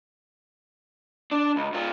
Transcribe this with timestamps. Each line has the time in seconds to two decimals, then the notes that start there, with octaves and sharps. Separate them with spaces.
1.31 D4
1.56 C#2
1.73 G#2 F4